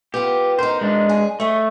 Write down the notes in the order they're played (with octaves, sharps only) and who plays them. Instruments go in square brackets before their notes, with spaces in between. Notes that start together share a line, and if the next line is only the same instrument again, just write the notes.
[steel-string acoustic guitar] B3 F4 [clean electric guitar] G4
[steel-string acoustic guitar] D#4 A#4 [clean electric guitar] C5
[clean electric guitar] G#3 D4
[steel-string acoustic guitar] G#4
[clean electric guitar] A3 [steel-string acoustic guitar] C#5 D#5